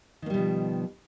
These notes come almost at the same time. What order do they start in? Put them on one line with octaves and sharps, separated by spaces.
D#3 A#3 G3 B2 F3